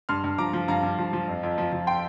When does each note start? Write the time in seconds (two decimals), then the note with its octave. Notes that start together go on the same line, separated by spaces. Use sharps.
0.09 G2 C6 F6
0.24 G2
0.38 F3 A#5 D6
0.53 F3
0.68 G2 F5 A#5
0.83 G2
0.99 F3
1.13 F3
1.28 F2
1.43 F2
1.58 F3
1.72 F3
1.87 G5 C6